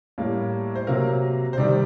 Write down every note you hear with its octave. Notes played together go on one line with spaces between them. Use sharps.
A2 G3 A#3
C5
C3 F#3 A#3 A#4
C5
C3 D#3 G3 D5